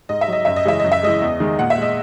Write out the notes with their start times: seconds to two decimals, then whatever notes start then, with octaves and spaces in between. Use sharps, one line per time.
0.09 G#2 D#5
0.21 E5
0.28 F#3 D#5
0.45 F#2 E5
0.56 D#5
0.65 C#3 E3 G#3 E5
0.80 F#2 D#5
0.92 E5
1.03 E3 G#3 D#5
1.22 E2
1.40 D#3 G#3
1.59 A#2 F#5
1.70 E5
1.78 G#3 D#5